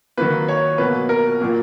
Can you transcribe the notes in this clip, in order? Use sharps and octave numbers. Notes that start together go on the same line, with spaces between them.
D#3 F#3 A#3 B4
C#5
B2 F#3 A#3 B4
A#4
A#2 F#3 A#3